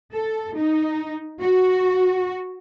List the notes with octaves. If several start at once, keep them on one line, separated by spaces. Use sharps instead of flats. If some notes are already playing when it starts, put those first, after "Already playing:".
A4
D#4
F#4